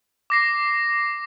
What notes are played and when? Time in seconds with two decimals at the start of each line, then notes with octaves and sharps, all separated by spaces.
0.30 D6 A#6 C7